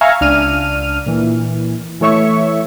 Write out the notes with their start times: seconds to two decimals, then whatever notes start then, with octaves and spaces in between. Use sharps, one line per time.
0.01 E5 F5 G#5 A#5 C#6
0.21 C#2 D4 F6 D#7
1.06 A#2 E3
2.01 E3 A3 C#5 E5 C#6